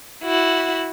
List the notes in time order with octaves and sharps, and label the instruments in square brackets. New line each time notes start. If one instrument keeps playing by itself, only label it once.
[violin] E4 F#4